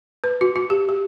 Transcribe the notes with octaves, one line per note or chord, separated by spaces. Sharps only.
B4
F#4
F#4
G4
G4